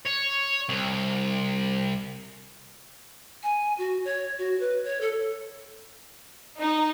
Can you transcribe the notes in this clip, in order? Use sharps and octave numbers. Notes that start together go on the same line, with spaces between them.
C#5
C2
G#5
F#4
C#5
F#4
B4
C#5
A4
D#4